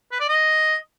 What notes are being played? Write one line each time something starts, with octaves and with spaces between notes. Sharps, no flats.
B4
D5
D#5